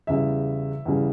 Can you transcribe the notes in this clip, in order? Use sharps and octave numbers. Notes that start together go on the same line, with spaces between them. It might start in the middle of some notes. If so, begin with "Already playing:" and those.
E2 C#3 G3 E5
E2 C#3 G3